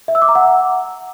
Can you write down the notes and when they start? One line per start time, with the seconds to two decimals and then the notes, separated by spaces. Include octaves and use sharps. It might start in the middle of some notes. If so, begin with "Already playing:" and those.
0.08 E5
0.15 E6
0.22 D6
0.29 A#5
0.35 F#5